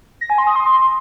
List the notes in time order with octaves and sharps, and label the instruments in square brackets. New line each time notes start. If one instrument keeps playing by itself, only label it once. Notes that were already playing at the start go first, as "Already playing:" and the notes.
[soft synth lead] A#6
G#5
C6
D#6
C6